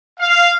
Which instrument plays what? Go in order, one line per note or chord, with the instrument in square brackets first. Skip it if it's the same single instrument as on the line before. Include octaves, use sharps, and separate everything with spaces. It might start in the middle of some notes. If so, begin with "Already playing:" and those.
[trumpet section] F5